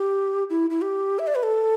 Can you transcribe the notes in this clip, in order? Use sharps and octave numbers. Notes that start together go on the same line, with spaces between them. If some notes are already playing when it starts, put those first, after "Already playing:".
Already playing: G4
E4
E4
G4
E5
D5
B4
A4